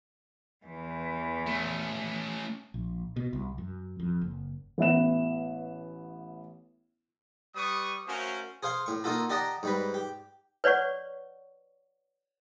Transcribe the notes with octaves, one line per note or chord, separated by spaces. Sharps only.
E2 E3
A3 C#4
A#1
B2
C2
F#2
F2
F#1
A1 B3 E5 E7
G3 B4 C#6 D#6
A3 C#4 F#4 A#4 C5 F5
G#4 C5 F5 C6 C#6
A2 C#6
A#3 D#4 F4 F#4 A4
G4 D5 D#5 F#5 A5 A#5
G#2 G3 B4
G4
B4 C#5 D5 F#5 C#6